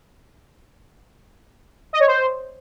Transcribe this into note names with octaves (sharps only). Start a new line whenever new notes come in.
D#5
C#5
C5